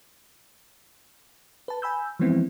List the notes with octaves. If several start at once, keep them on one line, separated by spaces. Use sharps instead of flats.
B4 A5
G#5 B5 E6 G6
E3 F3 G#3 B3 C4 E4